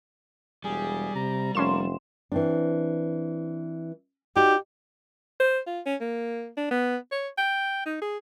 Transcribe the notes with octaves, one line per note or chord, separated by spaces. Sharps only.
E1 G3 G#4
C3 A#5
F1 A#3 C#4 C6 E7
E3 C4 D4
D#4 F#4 G4 D5
C5
F4
C#4
A#3
D4
B3
C#5
G5
D#4
G#4